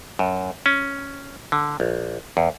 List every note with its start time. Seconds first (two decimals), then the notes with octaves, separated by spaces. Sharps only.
0.19 F#2
0.66 C#4
1.52 D3
1.80 A#1
2.37 E2